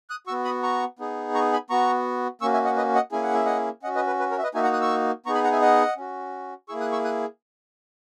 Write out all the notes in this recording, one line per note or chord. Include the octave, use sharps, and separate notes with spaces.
D#6 F#6
B3 F#4 C#6 E6
B5 D#6
A#5 C#6
B3 D#4 G#4
A#5 C#6
G#5 B5
B3 F#4 A#5 C#6
A#3 C#4 F#4 C#6 E6
E5 G#5
D#5 F#5
B4 D#5
D#5 F#5
A#3 C#4 E4 G#4 G#5
F#5
E5
D#5 F#5
C#4 F#4 D#5 F#5
B4 D#5
B4
B4
A#4 C#5
E5
B4 D#5
A#3 D#4 F#4 E5 G#5
F#5 A#5
D#6 F#6
C#6 E6
B3 D#4 G#4 A#5 C#6
G#5 B5
F#5 A#5
E5 G#5
D#5 F#5
C#4 F#4
A#3 E4 G#4 C#6 E6
D#6 F#6
C#6 E6
D#6 F#6